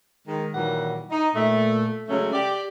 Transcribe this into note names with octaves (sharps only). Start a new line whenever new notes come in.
D#3 G#3
A#2 D#3 E3 F#3 G3 F#5
D#4
A#2 A3
C#3 F#3 G#3 A3 C#4
G4 D5